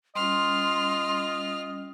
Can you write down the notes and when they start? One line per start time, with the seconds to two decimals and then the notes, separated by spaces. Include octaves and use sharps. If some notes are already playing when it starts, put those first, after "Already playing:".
0.15 G3 C#4 F4 D#5 C6 F6